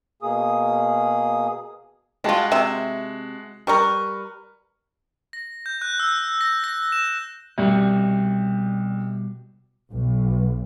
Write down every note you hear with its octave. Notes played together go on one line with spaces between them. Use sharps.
B2 A#3 G#4 D#6
G3 G#3 F4 F#4 A5
C3 E5
G3 A#4 B4 C#6
A#6
G6
F#6
E6
A#6
A#6
E7
C2 B2 G3 F#4
B1